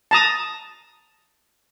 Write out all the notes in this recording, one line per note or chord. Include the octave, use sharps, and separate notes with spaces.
A5 A#5 D#6